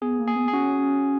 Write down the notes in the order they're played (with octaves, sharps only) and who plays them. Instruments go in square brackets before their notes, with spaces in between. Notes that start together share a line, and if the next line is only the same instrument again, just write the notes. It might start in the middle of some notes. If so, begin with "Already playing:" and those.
[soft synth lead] B3 [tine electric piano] G#4
[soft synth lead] A#3
[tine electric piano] G#4
[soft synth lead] B3
[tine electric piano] G#4
[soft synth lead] C#4 [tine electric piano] F#4